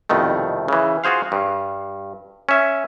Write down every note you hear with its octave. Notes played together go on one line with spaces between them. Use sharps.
C2 F2 B2 D#3 A3
C#3 E3
F4 F#4 G#4 C5 F5
G2
C#4 E5